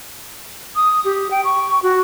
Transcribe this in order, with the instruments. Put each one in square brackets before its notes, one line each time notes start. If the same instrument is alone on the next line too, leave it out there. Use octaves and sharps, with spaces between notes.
[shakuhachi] D#6
G4
G5
C#6
F#4